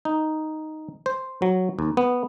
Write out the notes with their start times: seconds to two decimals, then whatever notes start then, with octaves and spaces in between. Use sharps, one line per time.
0.05 D#4
1.06 C5
1.42 F#3
1.79 D#2
1.97 B3